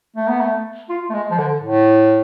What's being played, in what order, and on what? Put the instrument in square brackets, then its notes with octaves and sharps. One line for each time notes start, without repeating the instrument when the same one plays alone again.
[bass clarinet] A3
B3
A3
F4
A3
G#3
F3
D3
A2